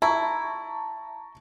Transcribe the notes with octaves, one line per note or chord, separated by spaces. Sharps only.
E4 A5 A#5 C#6